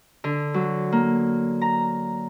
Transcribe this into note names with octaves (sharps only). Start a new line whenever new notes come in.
D3
F#3
A#3
A#5